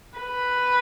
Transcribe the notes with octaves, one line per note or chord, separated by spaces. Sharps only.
B4